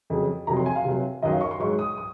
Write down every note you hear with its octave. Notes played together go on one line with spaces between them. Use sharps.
F2 C#3 F#3
F2 C3 F#3 A#5
C6
G#5
F5
C3 F#3
F#2 D#3 F#3 D#5
F5
C#6
C6
G#2 F#3 C#6
D#6
D#6